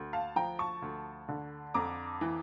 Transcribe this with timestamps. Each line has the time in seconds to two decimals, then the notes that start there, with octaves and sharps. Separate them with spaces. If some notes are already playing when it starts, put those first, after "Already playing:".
Already playing: D2
0.13 F5 A5
0.36 F3 G5 A#5
0.59 A5 C#6
0.82 D2
1.29 D3
1.74 F2 A#5 D6
2.21 E3